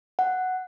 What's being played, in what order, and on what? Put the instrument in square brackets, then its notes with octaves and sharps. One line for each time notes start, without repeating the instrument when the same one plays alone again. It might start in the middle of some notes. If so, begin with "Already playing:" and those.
[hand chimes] F#5